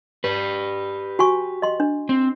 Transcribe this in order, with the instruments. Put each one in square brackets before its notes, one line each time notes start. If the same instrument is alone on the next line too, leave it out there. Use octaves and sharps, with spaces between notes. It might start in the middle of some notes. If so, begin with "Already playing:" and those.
[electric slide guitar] G4 B4
[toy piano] F#4 G#5 C#6
D#5 C6
D4
[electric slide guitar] C4